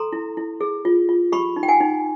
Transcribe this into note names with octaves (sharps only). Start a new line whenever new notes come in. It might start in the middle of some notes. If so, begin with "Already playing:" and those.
Already playing: A4 A#5 C6
E4
E4
G#4
F4
F4
G4 B5 C#6
D#4
G5
F#5 G#5
D#4